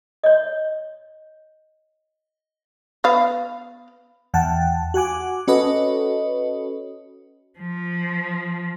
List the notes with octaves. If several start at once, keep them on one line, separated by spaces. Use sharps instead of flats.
C#5 D#5
B3 F5
E2 F#5 G5 A5
F#4 F#5 G#5 D6
C#4 F#4 A4 B4 C#5 D#5
F3